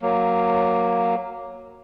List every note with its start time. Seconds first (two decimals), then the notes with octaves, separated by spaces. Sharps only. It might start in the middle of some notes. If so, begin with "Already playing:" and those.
0.02 F#3 A#3